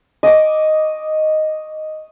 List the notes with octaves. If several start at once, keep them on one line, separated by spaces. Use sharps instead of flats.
D#5 C#6 D6